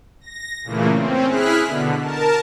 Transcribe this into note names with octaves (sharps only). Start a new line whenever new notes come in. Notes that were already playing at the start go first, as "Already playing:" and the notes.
A#6
A#2 C#3 E3 A3 A#3
C4 C#4
E4 G#4 F6 F#6 B6
B2 D3
A#4 A5